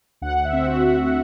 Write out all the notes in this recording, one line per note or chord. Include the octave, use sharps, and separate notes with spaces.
D2 F#5
E5
C4
F#4
C4
F#4